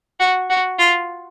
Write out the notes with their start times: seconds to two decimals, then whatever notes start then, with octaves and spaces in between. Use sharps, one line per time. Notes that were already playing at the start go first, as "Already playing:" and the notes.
0.20 F#4
0.50 F#4
0.79 F4